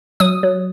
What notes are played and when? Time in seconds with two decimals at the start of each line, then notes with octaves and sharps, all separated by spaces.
0.20 F#3 D#6
0.43 F#3